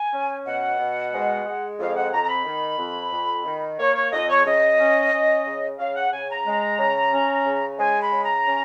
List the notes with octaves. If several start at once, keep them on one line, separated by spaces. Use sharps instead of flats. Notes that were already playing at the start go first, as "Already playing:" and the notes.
Already playing: G#5
C#4
B2 F#5
B2
G#3
G#3
F2 F5
F#5
F2 A#5
A#5
B5
D#3
F2
F2
D#3
A#3 C#5
C#5
F2 D#5
C#5
C#3 D#5
C#4
C#4
C#3
C#3 F5
F#5
C#3 G#5
A#5
G#3
C#3
C#4
C#3
G#3 G#5
B5
C#3
A#5
C#4